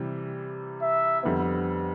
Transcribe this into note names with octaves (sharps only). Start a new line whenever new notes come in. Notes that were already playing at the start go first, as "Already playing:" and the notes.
Already playing: C3 E3 G3
E5
F2 D3 G3 B3